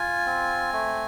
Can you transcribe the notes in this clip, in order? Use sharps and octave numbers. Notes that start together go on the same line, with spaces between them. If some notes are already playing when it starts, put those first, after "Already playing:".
Already playing: F4 G#5
C4
A3